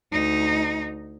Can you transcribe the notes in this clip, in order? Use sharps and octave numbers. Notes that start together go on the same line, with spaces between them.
D2 D#4